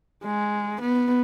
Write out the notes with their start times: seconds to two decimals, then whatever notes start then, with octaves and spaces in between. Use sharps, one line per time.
0.24 G#3
0.81 B3